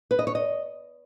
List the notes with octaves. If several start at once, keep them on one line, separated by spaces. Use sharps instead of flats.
B4
D#5
C#5
D#5